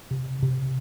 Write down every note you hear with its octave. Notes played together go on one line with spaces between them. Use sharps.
C3
C3